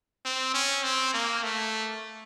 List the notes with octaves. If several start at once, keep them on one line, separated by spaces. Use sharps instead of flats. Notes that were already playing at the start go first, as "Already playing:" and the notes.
C4
C#4
C4
A#3
A3